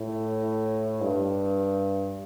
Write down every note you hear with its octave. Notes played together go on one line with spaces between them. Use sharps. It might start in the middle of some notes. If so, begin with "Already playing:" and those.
Already playing: A2
G2